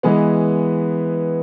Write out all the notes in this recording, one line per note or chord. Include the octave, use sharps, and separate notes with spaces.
E3 G#3 B3